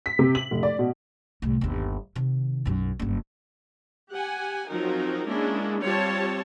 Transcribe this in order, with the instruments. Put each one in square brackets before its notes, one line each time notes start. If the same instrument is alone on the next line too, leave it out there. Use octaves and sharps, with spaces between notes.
[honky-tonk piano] B6
C3
F#7
F1
D5
B2
[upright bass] C2 A2
G1 D#2
C3 D#3
B1 F#2
F#1 G2
[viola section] G4 F#5 G#5
F3 F#3 C4 D#4 F#4 A#4
G#3 A#3 C#4 D4 E4
G3 C4 F4 G4 C#5 A5